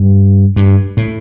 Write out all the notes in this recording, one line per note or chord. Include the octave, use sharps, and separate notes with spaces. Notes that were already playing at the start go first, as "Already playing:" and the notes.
Already playing: G2
G2
A2